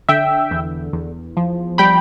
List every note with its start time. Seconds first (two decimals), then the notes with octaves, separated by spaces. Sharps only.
0.09 D3 E5 G5
0.51 E2
0.93 E2
1.37 F3
1.78 G3 G5 B5